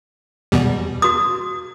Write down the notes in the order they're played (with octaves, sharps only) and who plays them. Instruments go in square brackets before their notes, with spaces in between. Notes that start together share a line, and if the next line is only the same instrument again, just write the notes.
[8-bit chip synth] E2 B2 G3
[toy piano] F#4 D#6